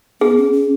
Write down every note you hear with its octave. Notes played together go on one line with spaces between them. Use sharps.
B3 G#4
C#4
C#4